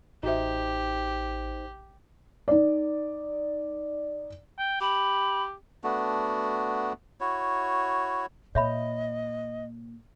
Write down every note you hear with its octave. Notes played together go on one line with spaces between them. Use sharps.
A1 D#4 F#4 G4 C5 E5
D#4 D5
G5
G4 B5
A3 B3 D4 F#4
E4 F#4 C#5
A#2 C#5 D#5 E5 B5